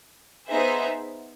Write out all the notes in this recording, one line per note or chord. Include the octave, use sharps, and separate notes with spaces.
B3 D#4 G#4 C5 E5